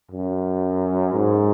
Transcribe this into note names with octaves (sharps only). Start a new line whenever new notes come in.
F#2
G#2